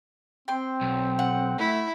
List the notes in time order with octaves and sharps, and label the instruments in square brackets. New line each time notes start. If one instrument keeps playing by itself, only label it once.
[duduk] C4 [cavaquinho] G5 C6
[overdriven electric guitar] B1
[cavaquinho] F#5
[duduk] A3 [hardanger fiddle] E4